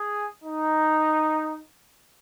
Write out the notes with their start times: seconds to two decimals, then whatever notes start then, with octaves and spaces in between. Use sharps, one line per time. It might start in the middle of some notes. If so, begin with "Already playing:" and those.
Already playing: G#4
0.44 D#4